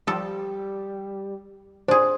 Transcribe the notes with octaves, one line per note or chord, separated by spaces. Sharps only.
F3 G3 A4
D4 G#4 C5